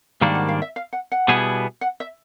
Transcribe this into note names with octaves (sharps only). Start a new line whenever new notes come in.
G#2 D#3 G3 A#3 D4 F5
F#5
F5
E5
F5
F#5
F#5
B2 G3 B3 E4 G#4
F#5
E5